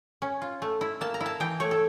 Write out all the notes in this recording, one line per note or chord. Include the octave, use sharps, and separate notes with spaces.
C#4
F4
A3
E4
A#3 A5
A#5
E4
A5
E3 G5
A3 C#5
A4